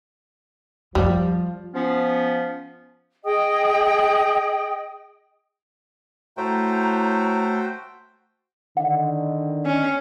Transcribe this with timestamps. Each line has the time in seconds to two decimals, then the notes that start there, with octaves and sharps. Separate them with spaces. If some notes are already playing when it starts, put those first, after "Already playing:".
0.95 F#2 F3 G3
1.74 F3 B3 C#4
3.24 G#4 D#5 G5 D#6
6.37 A2 A3 F#4 C5 G5 A#5
8.77 D3 D#3 F#5
9.66 C#4